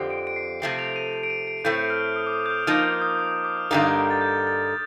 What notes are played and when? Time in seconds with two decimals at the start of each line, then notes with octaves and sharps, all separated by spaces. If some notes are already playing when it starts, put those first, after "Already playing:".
Already playing: F2 D3 F3 C4 G4
0.10 D7
0.27 D7
0.36 C7
0.62 C3 F3 A3 C4 C7
0.79 F7
0.96 D#7
1.13 D7
1.23 D7
1.30 D#7
1.47 D7
1.65 A2 A3 C4 G6
1.90 F6
2.16 D#6
2.27 D6
2.33 D#6
2.46 G6
2.50 F6
2.67 F3 A#3 D#4 F6
2.84 F6
3.02 D#6
3.19 D6
3.32 D#6
3.44 D6
3.57 F6
3.71 G2 D3 G3 A#3 D#4
4.11 A6
4.21 G6
4.47 A6